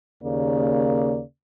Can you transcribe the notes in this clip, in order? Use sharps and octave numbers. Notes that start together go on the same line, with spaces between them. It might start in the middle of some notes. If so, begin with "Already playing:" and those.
D#2 C#3 A#3 D5